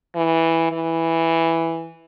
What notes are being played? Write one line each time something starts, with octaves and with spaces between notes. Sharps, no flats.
E3
E3